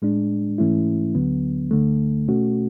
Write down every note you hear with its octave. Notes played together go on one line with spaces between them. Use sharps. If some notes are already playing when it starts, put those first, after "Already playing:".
A2 G#3 D4
G#2 E3 A3 C#4 E4
D2 D3 F#3 B3
D2 D3 A3
B2 A3 C#4 F#4